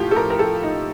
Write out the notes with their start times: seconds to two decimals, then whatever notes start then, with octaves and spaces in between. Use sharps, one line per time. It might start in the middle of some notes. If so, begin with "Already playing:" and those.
Already playing: A2 F3 F4 G4
0.11 A4
0.16 A2 A#4
0.30 A#4
0.39 A4
0.47 A3
0.63 D#4